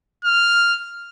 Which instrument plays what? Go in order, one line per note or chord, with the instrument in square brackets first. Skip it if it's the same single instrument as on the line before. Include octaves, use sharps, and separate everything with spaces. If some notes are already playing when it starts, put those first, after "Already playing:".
[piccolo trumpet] F6